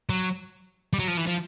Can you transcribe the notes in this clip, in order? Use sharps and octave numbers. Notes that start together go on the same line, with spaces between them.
F#3
G3
F#3
F3
E3
F3